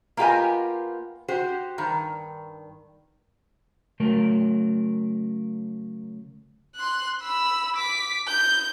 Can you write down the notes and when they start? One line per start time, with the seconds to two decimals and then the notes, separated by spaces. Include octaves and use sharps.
0.17 A#3 B3 F4 G4 D#5 G#5
1.28 F#4 G4 C5
1.78 G2 D#3
4.00 C#3 F#3 A3 A#4
6.75 C6 F#6
7.22 B5 E6
7.76 D6 B6
8.27 G6